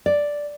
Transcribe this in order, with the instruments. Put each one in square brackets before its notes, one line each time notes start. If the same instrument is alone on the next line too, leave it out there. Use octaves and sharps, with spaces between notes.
[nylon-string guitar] D5